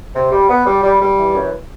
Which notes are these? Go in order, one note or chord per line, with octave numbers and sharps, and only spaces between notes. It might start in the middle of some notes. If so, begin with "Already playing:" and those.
C3
G3
B3
G3
G3
G3
E3
F#2